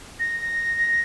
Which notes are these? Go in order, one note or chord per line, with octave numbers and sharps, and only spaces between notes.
A#6